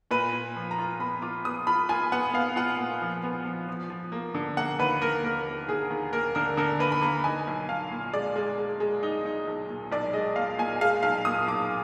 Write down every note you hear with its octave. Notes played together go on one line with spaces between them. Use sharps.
A#2 B4
A#2
F3
A#5
F4
B3 B5
F4 D6
B3 D#6
F4 B5
F4 G#5
B3 F#5
B3 F5
F4 F#5
A#2
F3
B3
F3
F3
F3
A#3
D3
A#3 F#5
D#2 B4
A#3 A#4
A#3 A#4
A#3
D#2 G#4
D#2
A#3 A#4
D3 A#4
D3 A#4
A#3 B4
B5
A#3 A#5
D#4 G#5
B1
B1 F5
A#2
G#3 D5
G#3
G#3
G#3
D#4
D#4
B1
A#2
B1 D5
G#3 D#5
A#2 F5
A#2 G#5
G#3 F5
B1 F5
A#2 D#6
B1 D6